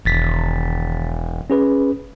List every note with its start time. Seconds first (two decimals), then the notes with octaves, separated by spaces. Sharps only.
0.05 E1 D#3 A6 B6
1.50 C#4 G#4 B4